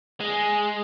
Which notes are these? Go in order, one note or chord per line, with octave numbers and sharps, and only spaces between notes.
G#3